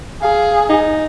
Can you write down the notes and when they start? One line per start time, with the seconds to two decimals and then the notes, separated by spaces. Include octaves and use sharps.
0.23 G#4 F5
0.69 D#4